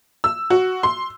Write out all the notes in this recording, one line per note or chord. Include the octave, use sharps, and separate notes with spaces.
E6
F#4
C6